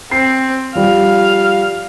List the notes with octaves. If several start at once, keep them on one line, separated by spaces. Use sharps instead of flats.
C4 C7
F3 G3 F5